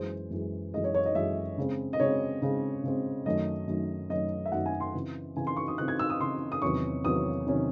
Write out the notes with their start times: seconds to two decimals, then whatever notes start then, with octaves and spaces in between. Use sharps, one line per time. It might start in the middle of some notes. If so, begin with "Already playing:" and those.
Already playing: F#2 E3 G#3 C5
0.31 F#2 E3 G#3
0.74 F#2 E3 G#3 D#5
0.84 C#5
0.95 C#5
1.05 D#5
1.15 F#2 E3 G#3 E5
1.58 C#3 G#3 C4
1.93 D#5
2.00 C#3 G#3 C4 C#5
2.42 C#3 G#3 C4
2.84 C#3 G#3 C4
3.25 F#2 D#3 F#3 A3 D#5
3.68 F#2 D#3 F#3 A3
4.10 F#2 D#3 F#3 A3 D#5
4.46 E5
4.52 F#2 D#3 F#3 A3 F#5
4.66 G#5
4.80 C6
4.94 C#3 E3 C4
5.36 C#3 E3 C4 G#5
5.47 C6
5.57 C#6
5.68 D#6
5.78 C#3 E3 C4 F#6
5.88 G#6
5.99 E6
6.10 D#6
6.20 C#3 E3 C4 C6
6.52 D#6
6.62 E2 C3 D#3 F#3 C#4 C#6
7.05 E2 C3 D#3 F#3 C#4 D#6
7.46 C3 D#3 F#3 C#4